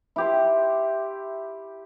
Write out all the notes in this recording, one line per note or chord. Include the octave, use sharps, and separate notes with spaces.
E4 G4 C6